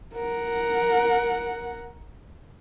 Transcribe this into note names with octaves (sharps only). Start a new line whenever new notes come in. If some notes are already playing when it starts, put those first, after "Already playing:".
A#4 F#5